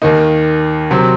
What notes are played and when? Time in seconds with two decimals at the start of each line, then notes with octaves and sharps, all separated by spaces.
0.02 D#2 D#3 A#3 D#4
0.91 C3 F#3 C4